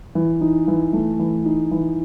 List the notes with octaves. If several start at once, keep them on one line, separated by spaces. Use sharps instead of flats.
E3
D#4
E3
A3
E3
D#4
E3